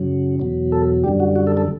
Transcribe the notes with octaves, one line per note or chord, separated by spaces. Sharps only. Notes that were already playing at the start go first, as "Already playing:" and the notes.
Already playing: F#2 C#3 F#3
E2 B2 F#3
A4
F#2 D3 G3 G4
F#4
F#4
A4
A4